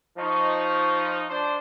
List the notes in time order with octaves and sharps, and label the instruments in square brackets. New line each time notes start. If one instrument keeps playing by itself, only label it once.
[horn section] F3 D#4 [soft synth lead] C#6
[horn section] D4 C5